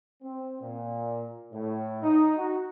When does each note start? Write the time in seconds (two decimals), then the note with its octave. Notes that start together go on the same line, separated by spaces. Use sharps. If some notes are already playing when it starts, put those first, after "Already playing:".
0.22 C4
0.61 A#2
1.52 A2
2.02 D#4
2.36 F#4